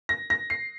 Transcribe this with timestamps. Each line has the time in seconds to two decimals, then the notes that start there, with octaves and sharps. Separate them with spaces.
0.09 A#6
0.30 A#6
0.50 C7